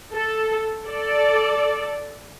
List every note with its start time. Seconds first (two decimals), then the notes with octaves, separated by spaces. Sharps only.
0.14 A4
0.84 A4 D5